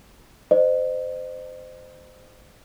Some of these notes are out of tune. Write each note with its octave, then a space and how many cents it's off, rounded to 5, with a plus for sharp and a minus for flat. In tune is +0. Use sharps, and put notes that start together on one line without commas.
C5 -20 D#5 -35